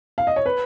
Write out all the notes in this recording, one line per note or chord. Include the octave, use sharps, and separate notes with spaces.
F5
D#5
C#5
B4